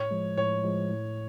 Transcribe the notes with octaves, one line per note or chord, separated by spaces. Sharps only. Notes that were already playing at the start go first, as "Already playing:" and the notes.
Already playing: A2 C#5
F3 G#3
A2 C#5
F3 G#3
A2